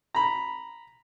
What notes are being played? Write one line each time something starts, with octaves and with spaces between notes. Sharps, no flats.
A#5 B5